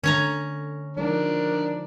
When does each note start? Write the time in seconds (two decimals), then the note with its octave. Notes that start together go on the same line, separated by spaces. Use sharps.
0.04 D3 C#4 C#5 A#5
0.97 F3 G#3 D4 D#4 A#4